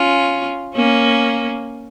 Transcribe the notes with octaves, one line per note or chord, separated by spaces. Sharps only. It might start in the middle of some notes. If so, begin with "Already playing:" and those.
Already playing: C#4 F4
A#3 C#4